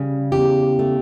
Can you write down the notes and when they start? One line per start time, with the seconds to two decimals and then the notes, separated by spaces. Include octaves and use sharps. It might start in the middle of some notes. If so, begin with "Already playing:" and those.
Already playing: C#3 G3
0.32 E2 G4
0.79 A3